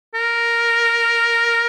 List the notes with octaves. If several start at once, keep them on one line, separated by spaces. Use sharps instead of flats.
A#4